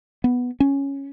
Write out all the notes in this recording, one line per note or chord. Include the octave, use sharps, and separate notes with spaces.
B3
C#4